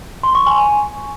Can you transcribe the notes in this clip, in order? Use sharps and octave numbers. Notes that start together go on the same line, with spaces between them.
C6
C#6
G#5